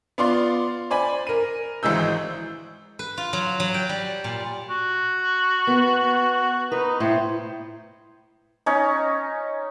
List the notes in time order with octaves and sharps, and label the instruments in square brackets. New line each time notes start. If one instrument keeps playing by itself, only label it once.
[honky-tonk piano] B3 F4 D5 C6
C5 D5 G#5 B5
A#4 D#7
G#1 E3 G#3 E6 G6
[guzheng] B4
F4
F#3
F#3
G5
G3
A#2
[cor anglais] F#4
[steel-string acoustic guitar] B3
[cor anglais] D#4 [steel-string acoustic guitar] B4
[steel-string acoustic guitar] A2 [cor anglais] C5
[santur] C#4 D#4